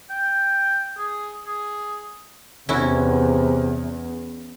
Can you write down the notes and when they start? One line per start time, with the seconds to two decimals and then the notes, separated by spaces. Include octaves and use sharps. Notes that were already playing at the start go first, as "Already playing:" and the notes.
0.10 G5
0.98 G#4
1.46 G#4
2.69 E2 C3 C#4 E4 F#4